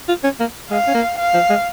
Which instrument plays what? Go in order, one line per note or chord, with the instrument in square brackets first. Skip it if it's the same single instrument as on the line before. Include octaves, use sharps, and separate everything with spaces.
[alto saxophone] F4
C#4
A#3
[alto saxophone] G#3 [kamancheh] F5
[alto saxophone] C#4
A#3
[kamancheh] F5
[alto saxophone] F3
G#3